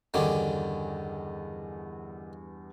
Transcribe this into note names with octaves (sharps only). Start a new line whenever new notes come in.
E2 G2 D3 D#3 C#4 D6